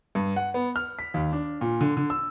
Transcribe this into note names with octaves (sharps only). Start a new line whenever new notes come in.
G2
F#5
B3
F6
B6
D#2
D4
A#2
D3
D3
E6